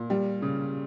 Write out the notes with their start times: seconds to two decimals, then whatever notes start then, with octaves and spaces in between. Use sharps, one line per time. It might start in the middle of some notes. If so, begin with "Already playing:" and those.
Already playing: A#2
0.10 G3
0.42 C#3